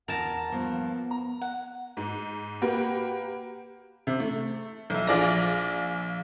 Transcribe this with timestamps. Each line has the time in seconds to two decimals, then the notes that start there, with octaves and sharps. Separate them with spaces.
0.08 E2 A#4 F#5 A5
0.52 G2 F3 A#3 B3
1.11 A#5
1.41 F#5
1.97 G#2
2.61 A#3 F#4 G4 B4
4.07 C3
4.20 A3
4.90 B1 E5
5.07 A#1 F4 G#4 D5 F6 A#6